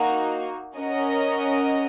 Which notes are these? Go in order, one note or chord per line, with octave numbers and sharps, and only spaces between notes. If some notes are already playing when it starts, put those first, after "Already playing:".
Already playing: A#3 D#4 F#4
C#4 A#4 D#5 F#5